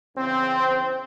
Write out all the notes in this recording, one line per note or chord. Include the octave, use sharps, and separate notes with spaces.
E2 C#3 C4